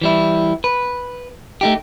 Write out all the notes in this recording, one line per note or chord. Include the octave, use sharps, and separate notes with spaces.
E3 G3 E4
B4
A3 D#4 G4